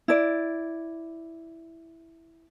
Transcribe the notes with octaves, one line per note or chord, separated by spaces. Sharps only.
E4 D5